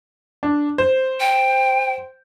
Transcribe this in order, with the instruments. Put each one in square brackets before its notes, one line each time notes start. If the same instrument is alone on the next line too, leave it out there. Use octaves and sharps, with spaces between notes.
[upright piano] D4
C5
[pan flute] G5